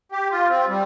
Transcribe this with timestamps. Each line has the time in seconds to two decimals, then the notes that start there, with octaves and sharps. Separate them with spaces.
0.12 G4
0.31 F4
0.49 C4
0.68 G3